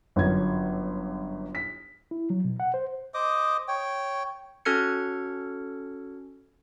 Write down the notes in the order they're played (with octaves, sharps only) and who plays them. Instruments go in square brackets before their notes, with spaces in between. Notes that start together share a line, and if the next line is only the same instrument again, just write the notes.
[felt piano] G1 F#2 G#6
B6
[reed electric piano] E4
F#3
B2
F#5
C5
[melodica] C5 D#5 D6 D#6
C#5 G5
[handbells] C#4 F#4 A4 F6 G#6 C#7